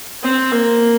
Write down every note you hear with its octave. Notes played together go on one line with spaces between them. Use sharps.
C4
A#3